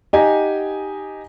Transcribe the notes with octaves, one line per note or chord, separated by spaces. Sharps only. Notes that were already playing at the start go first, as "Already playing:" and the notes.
D#4 G4 D#5 F#5 G#5 A#5